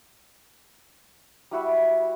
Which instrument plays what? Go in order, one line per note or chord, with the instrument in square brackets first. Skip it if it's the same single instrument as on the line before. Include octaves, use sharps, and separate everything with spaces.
[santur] G3 E4 F#4 E5